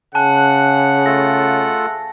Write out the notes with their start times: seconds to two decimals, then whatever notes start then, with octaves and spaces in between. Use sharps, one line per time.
0.15 C#3 F#5 G#5 A5 F#6
1.06 A3 F4 A4 A#6